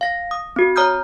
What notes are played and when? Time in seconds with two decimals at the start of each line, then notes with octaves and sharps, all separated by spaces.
0.01 F5 A#6
0.31 D#6
0.56 C4 F#4
0.76 C#5 A#5 D#6 F6 G6